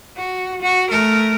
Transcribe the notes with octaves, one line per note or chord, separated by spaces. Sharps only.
F#4
F#4
A3 A#4